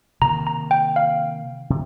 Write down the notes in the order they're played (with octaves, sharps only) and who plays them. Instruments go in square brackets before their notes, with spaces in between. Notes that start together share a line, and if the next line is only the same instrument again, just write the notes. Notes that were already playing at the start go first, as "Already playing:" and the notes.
[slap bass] C3 D#3 A#3 [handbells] A#5
[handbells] A#5
G5
F5
[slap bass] C3